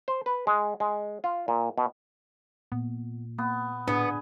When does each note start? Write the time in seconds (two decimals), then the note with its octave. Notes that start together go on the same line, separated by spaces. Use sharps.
0.08 C5
0.26 B4
0.47 G#3
0.80 G#3
1.24 F4
1.48 A#2
1.78 B2
2.72 A#2 B3
3.38 A#3 B3
3.88 A2 B3 D4 G#4 B4